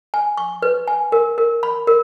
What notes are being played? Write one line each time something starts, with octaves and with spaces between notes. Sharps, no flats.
G#5
C#6
B4
G#5
A#4
A#4
B5
A#4